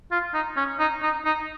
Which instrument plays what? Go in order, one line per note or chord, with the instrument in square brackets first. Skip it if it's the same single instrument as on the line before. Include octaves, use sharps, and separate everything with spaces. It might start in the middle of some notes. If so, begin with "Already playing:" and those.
[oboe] F4
D#4
C#4
D#4
D#4
D#4